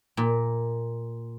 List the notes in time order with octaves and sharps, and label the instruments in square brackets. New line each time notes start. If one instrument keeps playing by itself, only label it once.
[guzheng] A#2